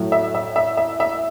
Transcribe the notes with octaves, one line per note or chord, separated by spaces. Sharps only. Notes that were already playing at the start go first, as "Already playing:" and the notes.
Already playing: A2 F#3 A3
E5
E5
E5
E5
E5